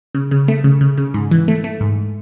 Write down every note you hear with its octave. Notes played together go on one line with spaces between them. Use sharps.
C#3
C#3
A3
C#3
C#3
C#3
G#2
E3
A3
A3
G#2